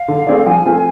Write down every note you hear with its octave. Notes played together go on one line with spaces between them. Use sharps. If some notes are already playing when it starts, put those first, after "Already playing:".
Already playing: F5
D3
A3 C4 G#4 D5
F3 G#5
A3 C4 F4